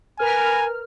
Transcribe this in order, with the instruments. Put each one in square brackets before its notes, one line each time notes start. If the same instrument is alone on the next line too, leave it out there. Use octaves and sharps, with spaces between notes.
[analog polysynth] A#4 B4 F6 [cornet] G#5